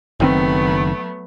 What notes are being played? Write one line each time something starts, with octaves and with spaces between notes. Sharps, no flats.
F#1 D#3 F#3 A3 B3 C4